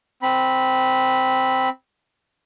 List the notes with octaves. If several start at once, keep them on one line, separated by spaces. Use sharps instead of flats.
C4 B5